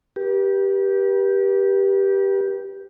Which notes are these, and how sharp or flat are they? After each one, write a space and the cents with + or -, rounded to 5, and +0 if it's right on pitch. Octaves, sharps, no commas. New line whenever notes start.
G4 +0 B4 -40